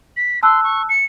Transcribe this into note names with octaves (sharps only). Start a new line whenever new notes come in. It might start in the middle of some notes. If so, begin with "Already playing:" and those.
B6
A5 C6 E6 F#6
C#6
C#7